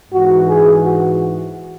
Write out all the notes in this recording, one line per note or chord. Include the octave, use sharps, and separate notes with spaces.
G#2 E3 F#4
G#4
F#4